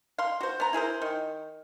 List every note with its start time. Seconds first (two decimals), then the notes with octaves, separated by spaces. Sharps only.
0.18 F5 C6
0.41 F#4 C5
0.60 B3 A#5
0.73 E4 G#4 A#4 C5
1.02 D#3